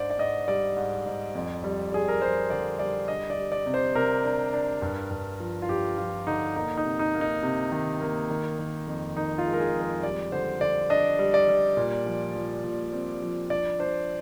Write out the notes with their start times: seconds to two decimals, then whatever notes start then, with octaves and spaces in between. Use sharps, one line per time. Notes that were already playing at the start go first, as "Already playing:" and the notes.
Already playing: G#2 D4 C5 D5
0.10 D5
0.18 G#2 D#5
0.48 G3 D5
0.77 G#2
1.06 G#2
1.35 F2
1.64 G3
1.92 G3 G#4
2.08 A#4
2.22 G3 C5
2.50 D3 D5
2.79 G3 D5
3.08 D4 D#5
3.30 D5
3.38 G3
3.52 D5
3.66 C3
3.74 C5
3.95 C3 A#4
4.24 D4
4.53 D4
4.82 G2
5.11 G2
5.40 F3
5.62 F4
5.69 G2 G4
5.98 F3 F4
6.27 D3 D#4
6.56 A#3 D#4
6.77 D#4
6.85 C3
6.99 D#4
7.14 A#3
7.21 D#4
7.43 C3
7.72 D#3
8.01 A#3
8.30 D#3
8.59 D#3
8.87 F2
9.16 D#3 D#4
9.38 F4
9.46 G#3
9.53 A#4
9.59 G#4
9.74 F2
9.82 A#4
10.03 G3 D5
10.32 D3 C5
10.61 D3 D5
10.90 D4 D#5
11.19 G3
11.34 D5
11.48 G3
11.77 A#2
12.06 F3
12.35 F3
12.64 A#2
12.93 C4
13.22 F3
13.50 D4 D5
13.79 D4 C5